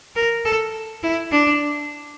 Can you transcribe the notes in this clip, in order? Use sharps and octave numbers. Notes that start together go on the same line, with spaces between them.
A#4
A4
E4
D4